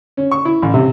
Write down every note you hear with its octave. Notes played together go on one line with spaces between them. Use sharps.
C#4
C#6
E4
A1
C3